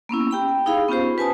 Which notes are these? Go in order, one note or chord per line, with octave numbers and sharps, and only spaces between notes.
A#3 B3 C#4 E4
G4 G5 B5
D#4 E4 G#4 F5 B5
B3 C#4 F4 G4 C5
B4 G#5 A5 D#6